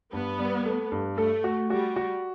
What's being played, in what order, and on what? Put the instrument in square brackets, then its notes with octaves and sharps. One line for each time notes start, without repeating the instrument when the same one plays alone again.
[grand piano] G2 [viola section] B3
[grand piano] G3
A3
G2
[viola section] A3 [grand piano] A4
[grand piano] F#4
[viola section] G3 [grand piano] F#4
[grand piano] F#4